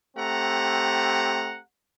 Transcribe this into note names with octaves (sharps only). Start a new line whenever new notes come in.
A3 C4 G4 F#5 A#5